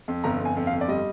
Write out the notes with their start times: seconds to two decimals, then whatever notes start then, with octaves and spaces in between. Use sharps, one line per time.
0.08 F2
0.24 G1 A#5
0.40 F2
0.45 G#5
0.56 F2
0.67 F5
0.72 G1
0.81 D5
0.88 G3 D#5